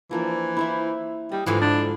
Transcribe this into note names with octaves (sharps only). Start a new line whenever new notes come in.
E3 F3 A#3 D4
E4 C5 E5
G3 D#5
G#2 D3 E3 F3
D4 E4